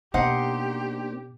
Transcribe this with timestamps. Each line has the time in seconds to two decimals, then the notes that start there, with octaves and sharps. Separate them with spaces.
0.14 B2 A#3 C4 D4 D#4 G4 C5 F#5